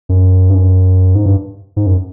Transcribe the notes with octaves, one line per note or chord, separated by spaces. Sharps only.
F#2
G2
F#2
G#2
G2
G#2
F#2